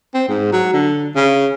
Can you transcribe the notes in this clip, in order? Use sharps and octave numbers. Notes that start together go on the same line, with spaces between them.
C4
G#2
F#3
D3
C#3